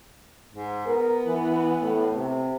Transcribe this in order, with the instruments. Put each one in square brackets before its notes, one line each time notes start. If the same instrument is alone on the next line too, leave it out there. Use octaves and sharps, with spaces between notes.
[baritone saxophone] G#2
[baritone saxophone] B3 [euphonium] A#4
[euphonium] E3
A2
C3